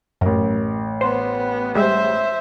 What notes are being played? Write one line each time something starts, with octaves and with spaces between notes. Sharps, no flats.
A1 F#2 A#4
B3 C5
G3 G#3 C5 E5